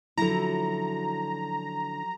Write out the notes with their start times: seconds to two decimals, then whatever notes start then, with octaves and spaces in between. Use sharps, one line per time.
0.18 D3 F3 F#3 E4 A4 A#5